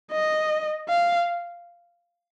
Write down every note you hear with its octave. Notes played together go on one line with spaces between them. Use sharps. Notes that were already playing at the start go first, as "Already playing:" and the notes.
D#5
F5